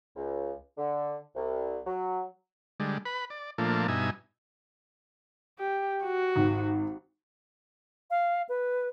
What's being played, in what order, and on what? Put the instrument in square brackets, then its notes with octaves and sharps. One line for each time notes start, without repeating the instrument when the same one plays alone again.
[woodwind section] C#2
D3
C2
F#3
[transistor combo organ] D3 G3 G#3
B4 B5
D5
A#2 F3 A3 A#3 D4
G2 B2 D#4 E5 G#5
[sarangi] G4
F#4
[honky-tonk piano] G#1
[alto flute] F5
B4